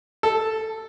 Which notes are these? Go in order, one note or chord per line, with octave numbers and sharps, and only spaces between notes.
A4